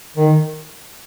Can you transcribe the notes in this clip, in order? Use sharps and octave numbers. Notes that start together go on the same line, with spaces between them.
D#3